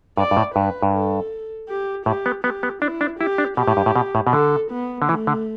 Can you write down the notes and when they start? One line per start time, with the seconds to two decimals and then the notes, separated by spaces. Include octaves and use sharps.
0.17 G2 D5
0.31 G2
0.37 A2
0.55 G2 B4
0.83 G2
0.93 A4
1.69 G4
2.06 A2 G4
2.26 B3
2.44 B3 G4
2.63 B3
2.82 D4 E4
3.01 D4
3.20 E4 G4
3.38 D4
3.57 B2 G4
3.68 A2
3.77 G2
3.86 A2
3.96 B2
4.15 A2
4.27 B2
4.33 D3 A4
4.71 B3
5.02 D3
5.09 E3 A3
5.27 D3